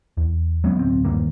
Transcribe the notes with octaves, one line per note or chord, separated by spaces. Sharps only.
E2
F#3 G#3 B3 C#4
D1 B1 C4
D#1 G2 D#3 A#3